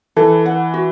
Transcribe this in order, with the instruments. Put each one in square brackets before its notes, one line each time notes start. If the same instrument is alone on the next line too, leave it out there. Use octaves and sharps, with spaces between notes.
[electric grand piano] E3 [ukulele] A4
[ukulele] F#5
F#4